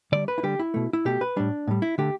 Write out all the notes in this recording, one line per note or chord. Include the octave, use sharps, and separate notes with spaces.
D3 G3 D5
B4
E4
D3 G3 G4
E4
B2 A3
E4
B2 A3 G4
B4
A2 G3 D4
A2 G3
E4
D3 A3 G4